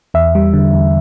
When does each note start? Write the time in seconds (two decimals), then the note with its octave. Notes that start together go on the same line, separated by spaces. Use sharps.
0.14 E2 E5
0.35 G3
0.54 D3
0.73 E2